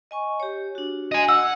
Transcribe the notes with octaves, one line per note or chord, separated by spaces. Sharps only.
D#5 G#5 C#6
G4 C#5
D4 F#4
D#5 G#5
F#5 E6